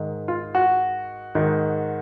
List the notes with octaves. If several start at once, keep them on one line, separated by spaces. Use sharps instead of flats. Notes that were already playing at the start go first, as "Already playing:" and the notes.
Already playing: G#2 D#3
F4
F#4
G#2 D#3